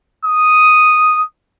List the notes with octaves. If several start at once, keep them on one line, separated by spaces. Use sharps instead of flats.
D#6